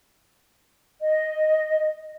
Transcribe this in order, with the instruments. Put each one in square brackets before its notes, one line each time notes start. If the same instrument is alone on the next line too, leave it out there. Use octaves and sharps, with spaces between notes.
[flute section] D#5